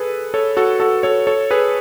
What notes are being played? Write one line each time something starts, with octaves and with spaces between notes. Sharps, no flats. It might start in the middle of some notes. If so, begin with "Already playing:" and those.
Already playing: G#4 A4 B4
A4 C#5
F#4 A4
F#4 A4
A4 C#5
A4 C#5
G#4 B4